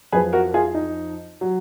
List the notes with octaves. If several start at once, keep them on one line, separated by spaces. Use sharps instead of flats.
F2 F3 G#4 B4
F#4 A#4
F4 G#4
D#4
F#3